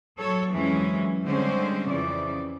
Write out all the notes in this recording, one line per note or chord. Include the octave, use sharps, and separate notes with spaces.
F#3 A4 C#5
F2 E3 F#3 G#3 C#4
D3 G3 G#3 C4 C#4 C5
F2 C#3 E3 D5